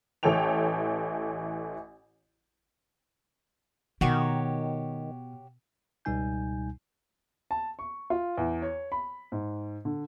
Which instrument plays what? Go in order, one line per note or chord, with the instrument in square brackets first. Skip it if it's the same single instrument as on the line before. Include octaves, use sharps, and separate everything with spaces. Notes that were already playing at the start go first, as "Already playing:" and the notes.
[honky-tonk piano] A1 E3 A4 C#5 G5 F7
[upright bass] B2 [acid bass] D#3 [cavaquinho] F#4 G4 C#5
[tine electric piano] C#2 B2 G3 D#4 G#5 G6
[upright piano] A5
C#6
F4
E2
C#5
B5
G#2
D3